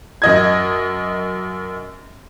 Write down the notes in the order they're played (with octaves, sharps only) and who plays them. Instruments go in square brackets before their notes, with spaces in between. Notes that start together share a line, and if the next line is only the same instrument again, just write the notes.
[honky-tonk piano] F#2 D#5 G#6